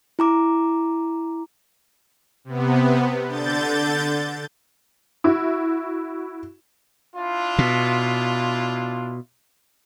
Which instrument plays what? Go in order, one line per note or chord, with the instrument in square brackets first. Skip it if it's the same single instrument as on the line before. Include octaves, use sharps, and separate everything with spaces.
[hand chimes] E4 A#5 D6
[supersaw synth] C3 B3
D3 G6 A6
[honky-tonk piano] E4 F#4
[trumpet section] D4 E4 F4
[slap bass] B2